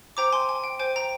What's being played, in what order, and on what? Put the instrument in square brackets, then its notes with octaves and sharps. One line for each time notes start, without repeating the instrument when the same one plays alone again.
[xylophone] C5 G5 A#5 D6
G#5 C6
G#5
G5
C5 G5 G#5
G5 A#5